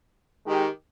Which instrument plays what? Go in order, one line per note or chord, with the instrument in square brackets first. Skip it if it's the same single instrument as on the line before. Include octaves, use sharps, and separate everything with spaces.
[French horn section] D#3 G#3 D#4 G4